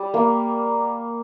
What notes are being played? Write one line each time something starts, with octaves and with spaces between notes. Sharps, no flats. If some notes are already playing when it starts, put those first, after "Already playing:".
Already playing: G3
A#3